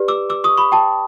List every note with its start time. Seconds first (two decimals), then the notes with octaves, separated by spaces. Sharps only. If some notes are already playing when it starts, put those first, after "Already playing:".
Already playing: G4 B4 D5
0.08 D6 E6
0.30 D6 E6
0.44 C#6 D#6
0.58 B5 C#6
0.72 G5 A5